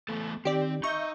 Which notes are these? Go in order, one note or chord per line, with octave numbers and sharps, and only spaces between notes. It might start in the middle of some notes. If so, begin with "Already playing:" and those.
E3 A3 B3 A4
D#3 C4 G4 D5
D#4 D#5 E5 C#6 G6